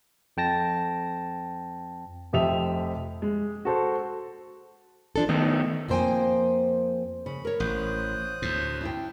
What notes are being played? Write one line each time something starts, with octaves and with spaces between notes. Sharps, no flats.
F2 G5 A5 A#6
F1 F3 G4 E5 D#6 F7
G#3
F#4 A4 C5
F3 D4 A4
D#3 A3 B3 D#4
F2 F3 A#3 C5 G5 G#5
C#3 B5
A#4 C#5
A1 C5 D#6 F#6
D2 A2
D4 E4 G5